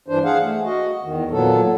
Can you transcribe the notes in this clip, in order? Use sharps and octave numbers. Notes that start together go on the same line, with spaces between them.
G2 E3 D4 C5
G#4 F5 F#5
A3
F#4 D#5
E2 D#3
A#2 F#3 B3 A4